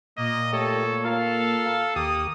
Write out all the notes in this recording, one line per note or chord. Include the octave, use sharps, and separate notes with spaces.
A#2 A#3 D#5
A3 G4 A4 C#5
F4 A4 A#4 F5
D#2 A#3 G4 D#6